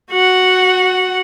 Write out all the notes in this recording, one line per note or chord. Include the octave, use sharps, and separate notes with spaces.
F#4 F#5